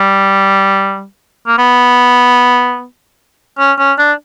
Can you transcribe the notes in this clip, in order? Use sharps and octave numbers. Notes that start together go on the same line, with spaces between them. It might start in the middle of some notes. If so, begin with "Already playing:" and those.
Already playing: G3
A#3
B3
C#4
C#4
D4